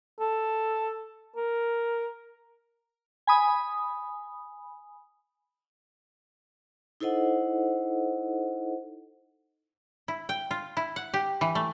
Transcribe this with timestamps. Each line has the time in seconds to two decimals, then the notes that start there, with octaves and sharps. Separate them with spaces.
0.20 A4
1.36 A#4
3.27 G#5 B5 D#6
7.01 D#4 E4 A4 C5 D#5 F#5
10.08 E4
10.29 G5
10.51 F4
10.77 E4
10.96 F#5
11.14 G4
11.41 E3
11.55 A3